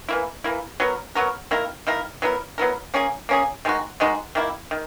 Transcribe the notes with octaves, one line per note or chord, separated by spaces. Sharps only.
E3 A#3 E4
E3 A#3 E4
F#3 B3 F#4 A#4
F#3 B3 F#4 A#4
D#3 A#3 E4 A#4
D#3 A#3 E4 A#4
F#3 B3 E4 A#4
F#3 B3 E4 A#4
A#3 C#4 G#4
A#3 C#4 G#4
D#3 G#3 D#4 F#4
D#3 G#3 D#4 F#4
D#3 A#3 E4
D#3